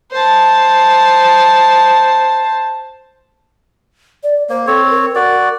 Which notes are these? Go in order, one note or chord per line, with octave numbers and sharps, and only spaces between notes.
C5 A5
D5
A#3 C5
C4 A4 C#5
A#4
F#4 A#4 D5